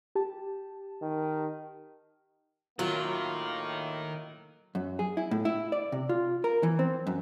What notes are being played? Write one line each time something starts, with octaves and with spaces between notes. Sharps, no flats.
G4 A5
D#3
A2 D#3 F#3 A#3 F4
F#2
G#4
E4
A2
E4
D5
C3
F4
A#4
E3
C4
F#2